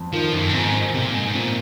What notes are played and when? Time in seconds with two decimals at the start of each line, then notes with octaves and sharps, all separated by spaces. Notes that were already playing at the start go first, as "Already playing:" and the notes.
Already playing: F2
0.13 D#3 F3
0.34 F#2
0.49 A#2
0.54 G#2 C4
0.94 C3 C4
1.05 A#2
1.14 G#2
1.35 A#2 C4